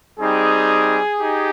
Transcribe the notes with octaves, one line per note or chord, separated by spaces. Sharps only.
G3 C4 D#4 G#4
D#4 G4